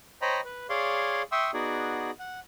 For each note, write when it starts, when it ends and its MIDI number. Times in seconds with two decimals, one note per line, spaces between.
0.22 0.41 72
0.22 0.41 73
0.22 0.41 75
0.22 0.41 79
0.22 0.41 82
0.22 0.41 83
0.45 0.67 71
0.69 1.22 68
0.69 1.22 73
0.69 1.22 74
0.69 1.22 77
0.69 1.22 84
1.32 1.51 76
1.32 1.51 79
1.32 1.51 84
1.32 1.51 85
1.32 1.51 87
1.32 1.51 88
1.54 2.11 59
1.54 2.11 63
1.54 2.11 66
1.54 2.11 68
1.54 2.11 74
2.19 2.40 78